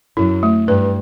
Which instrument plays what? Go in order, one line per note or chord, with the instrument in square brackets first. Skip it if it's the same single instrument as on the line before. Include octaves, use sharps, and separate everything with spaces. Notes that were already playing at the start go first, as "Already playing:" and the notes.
[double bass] F#2 [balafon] E4
[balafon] A3
[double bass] G2 [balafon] B4